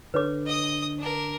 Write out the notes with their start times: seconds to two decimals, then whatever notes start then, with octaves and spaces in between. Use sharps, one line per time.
0.14 D3 B4 C#5 D6
0.46 D#5 D#6
0.98 D4 A#4